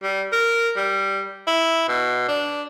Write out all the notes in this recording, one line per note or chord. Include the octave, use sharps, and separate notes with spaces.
G3
A#4
G3
E4
B2
D4